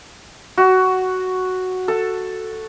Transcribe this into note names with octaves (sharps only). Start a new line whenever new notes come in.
F#4
A4